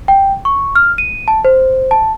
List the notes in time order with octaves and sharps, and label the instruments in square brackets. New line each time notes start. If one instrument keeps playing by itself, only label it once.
[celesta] G5
C#6
F6
D#7
A5
C5
A5